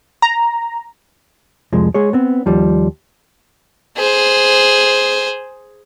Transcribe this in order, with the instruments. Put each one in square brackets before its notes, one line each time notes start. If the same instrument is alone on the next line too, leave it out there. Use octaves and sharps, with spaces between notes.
[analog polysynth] A#5
[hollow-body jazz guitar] C2 F2 F3 G#3
G#3 G#4 C#5
B3 C4
D#2 F3 G3
[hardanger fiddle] G#4 C5